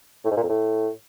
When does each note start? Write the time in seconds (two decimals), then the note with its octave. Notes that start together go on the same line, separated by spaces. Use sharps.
0.25 A2
0.31 G#2
0.37 A#2
0.43 F2
0.49 A2